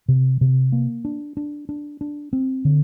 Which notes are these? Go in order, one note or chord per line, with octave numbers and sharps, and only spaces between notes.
C3
C3
A#3
D4
D4
D4
D4
C4
D3